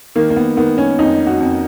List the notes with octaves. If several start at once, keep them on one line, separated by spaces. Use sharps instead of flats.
D#3 A#3
A#3
B3
D#3 B3
C#4
F2 D#4
F#4
F2